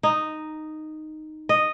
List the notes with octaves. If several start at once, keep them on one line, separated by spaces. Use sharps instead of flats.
D#4
D#5